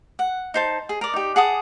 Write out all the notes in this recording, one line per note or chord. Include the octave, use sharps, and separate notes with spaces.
F#5
D#4 C5 A5
G#4
A#4 D5
D#4 G4
G#4 F#5 A5 D#6